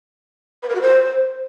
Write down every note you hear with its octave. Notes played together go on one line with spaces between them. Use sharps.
B4
A#4
F#4
C5